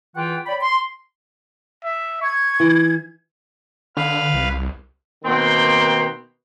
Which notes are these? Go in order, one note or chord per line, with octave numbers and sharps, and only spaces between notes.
E2 E3 F4 F#5 G5
C#5 D5 G5 B5
C6
E5
C#6 G#6
E3
D3 B4 F5 F6
C2
B2 D#3 A#3 C4 G5 C6